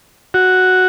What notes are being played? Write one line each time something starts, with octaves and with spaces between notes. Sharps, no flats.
F#4